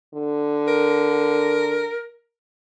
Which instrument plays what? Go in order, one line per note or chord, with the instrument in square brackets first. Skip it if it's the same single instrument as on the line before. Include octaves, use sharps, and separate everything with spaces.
[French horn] D3
[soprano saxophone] A#4